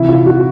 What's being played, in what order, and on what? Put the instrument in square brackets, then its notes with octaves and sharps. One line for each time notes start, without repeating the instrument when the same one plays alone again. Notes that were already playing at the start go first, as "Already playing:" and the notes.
Already playing: [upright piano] C3 E3 E4
F4
F#4